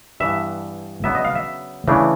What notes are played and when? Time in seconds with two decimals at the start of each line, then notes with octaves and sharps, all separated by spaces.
0.20 G2 E3 G3 B3 D4 E5
1.04 C#3 F#3 B3 D4 E5
1.15 D#5
1.25 F5
1.35 E5
1.88 C#3 E3 A3 D4